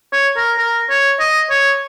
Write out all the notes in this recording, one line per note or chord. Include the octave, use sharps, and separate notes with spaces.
C#5
A#4
A#4
C#5
D#5
C#5